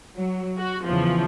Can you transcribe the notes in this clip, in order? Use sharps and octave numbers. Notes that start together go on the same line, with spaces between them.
F#3
F#4
E2 C#3 E3 F3